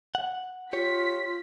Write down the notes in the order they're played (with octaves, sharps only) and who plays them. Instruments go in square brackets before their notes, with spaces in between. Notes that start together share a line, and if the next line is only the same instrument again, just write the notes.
[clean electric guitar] F#5
[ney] F4 [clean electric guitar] G4 C#5 [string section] B6